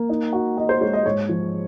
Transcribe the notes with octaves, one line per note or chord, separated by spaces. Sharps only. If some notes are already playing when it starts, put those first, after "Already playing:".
Already playing: A#3
D#4
F#4
F#4 D#5
C5
G#3 C#5
D#5
G#2 C#5
F3